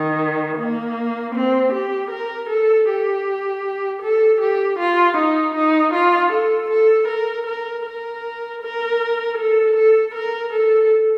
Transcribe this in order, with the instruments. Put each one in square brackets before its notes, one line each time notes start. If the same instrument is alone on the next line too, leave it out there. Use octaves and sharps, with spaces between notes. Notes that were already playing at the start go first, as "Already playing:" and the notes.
Already playing: [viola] D#3
A#3
C4
G4
A#4
A4
G4
A4
G4
F4
D#4
D#4
F4
A4
A4
A#4
A#4
A#4
A#4
A4
A4
A#4
A4